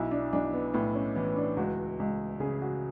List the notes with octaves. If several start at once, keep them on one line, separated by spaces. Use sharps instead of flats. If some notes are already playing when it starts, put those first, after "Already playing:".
Already playing: B1 E4
D4
B1 D4
B3
A2 B3
C#4
E3 B3
D4
C#2 F#4
C#2
C#3 G#4
F#4